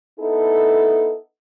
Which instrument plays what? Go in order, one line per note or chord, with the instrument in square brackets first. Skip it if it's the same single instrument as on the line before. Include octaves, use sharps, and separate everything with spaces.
[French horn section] B3 D#4 E4 A4